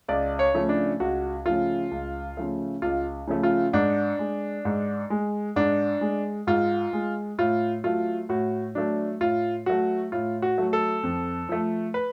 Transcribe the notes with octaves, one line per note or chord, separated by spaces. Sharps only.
C#2 D5
C#5
C#3 F3 A3
D4
C#2 F#4
C#3 F3 A3 F4
C#2
C#3 F3 A3
C#2 F4
C#3 F3 A3
F4
G#2 D4
G#3
G#2
G#3
G#2 D4
G#3
G#2 F4
G#3
A2 F4
F#3 A3 F4
A2 F#4
F#3 A3 D4
A2 F4
F#3 A3 F#4
A2 F4
F#4
F#3 A3
A4
F2
F3 A3
B4